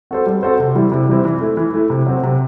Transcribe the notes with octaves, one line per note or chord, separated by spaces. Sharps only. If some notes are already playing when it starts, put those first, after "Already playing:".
C4 F#4 A4 C5
G3
C4 F#4 A4 C5
C3
E3 G3 C4 E4
C3
E3 G3 C4 E4
E3
A3 E4
E3
A3 E4
C3
F#3 C4
C3